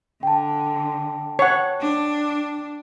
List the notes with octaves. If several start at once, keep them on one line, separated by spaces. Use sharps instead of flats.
D3 G5 A5
C#5 F#5
D4